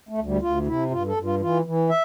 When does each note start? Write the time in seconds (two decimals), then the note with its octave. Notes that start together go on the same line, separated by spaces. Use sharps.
0.09 A3
0.18 D2
0.26 G3
0.41 D2 F4
0.67 C3 E4
0.91 G2 F4
1.07 A4
1.16 G2
1.24 F4
1.40 E3 F4
1.65 E3
1.89 E5